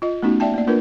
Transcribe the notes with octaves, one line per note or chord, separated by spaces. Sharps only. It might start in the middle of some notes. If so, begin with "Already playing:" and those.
F4 D#5
A3 B3 C#4 D#4 F#4
D5 E5 G5 A5
A#3 D5
A#3 D4 F4 A#4 B4